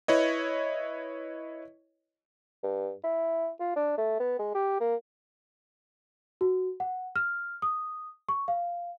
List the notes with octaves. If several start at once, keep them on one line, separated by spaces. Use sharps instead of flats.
E4 B4 C#5 D#5
G2
E4
F4
D4
A3
B3
G#3
G4
A#3
F#4
F#5
F6
D#6
C#6
F5